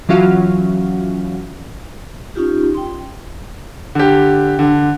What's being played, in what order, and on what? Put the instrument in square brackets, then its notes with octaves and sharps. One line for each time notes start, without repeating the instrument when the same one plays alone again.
[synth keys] E3 F#3 C#4 F4 F#4 F5
[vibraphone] C#4 D#4 F4 G4
G5 C6
[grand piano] D3 G4
D3